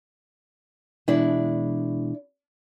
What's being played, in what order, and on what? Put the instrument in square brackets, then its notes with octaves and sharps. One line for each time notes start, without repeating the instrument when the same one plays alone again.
[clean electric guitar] B2 E3 G#3 [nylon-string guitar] D4 E4